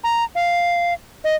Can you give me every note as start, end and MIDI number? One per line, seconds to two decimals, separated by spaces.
0.04 0.24 82
0.35 0.94 77
1.24 1.36 75